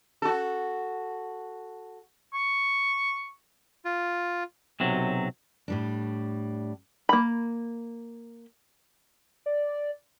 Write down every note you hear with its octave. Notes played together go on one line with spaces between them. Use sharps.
F#4 A4
C#6
F4
B1 C3 F#3
A2 G3 D4
A#3 B5
D5